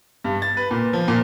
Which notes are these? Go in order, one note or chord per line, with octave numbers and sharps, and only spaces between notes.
G2
A6
B4
A#2
F3
A#2